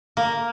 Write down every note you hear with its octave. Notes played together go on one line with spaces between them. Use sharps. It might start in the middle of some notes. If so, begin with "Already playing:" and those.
A#3